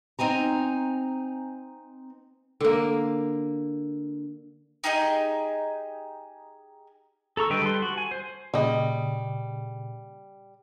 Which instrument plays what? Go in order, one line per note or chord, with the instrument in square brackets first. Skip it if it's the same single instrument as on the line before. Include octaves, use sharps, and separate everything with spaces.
[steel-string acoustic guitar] C4 D#4 G#5 A#5
[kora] D3 A#3
[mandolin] D#4 G4 G#4 D#5
[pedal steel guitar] A4 A#5 C#6 E6
D3 G3 B4 D#5 G5
G3 A4 B4 C6
F#4
G#5
C5
[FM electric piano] A#2 C#3 [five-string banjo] G3 D#5